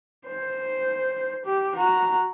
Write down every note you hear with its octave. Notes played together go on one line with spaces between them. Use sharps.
C5
G4
F#4 A#5